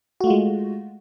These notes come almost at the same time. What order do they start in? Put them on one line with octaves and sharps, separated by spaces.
F#4 A3 F4 G#3